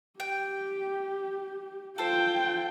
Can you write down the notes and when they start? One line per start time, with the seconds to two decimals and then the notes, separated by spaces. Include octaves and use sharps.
0.20 G4 G5
1.98 F4 A4 C5 G5